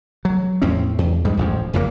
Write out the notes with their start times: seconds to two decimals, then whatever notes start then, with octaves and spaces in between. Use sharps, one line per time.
0.25 F#3
0.62 E2 A2 C4 C#4
0.98 E2
1.25 E2 G#2 G3 G#3
1.37 D1 A1 F2 F3
1.73 F#1 F2 C#3 A#3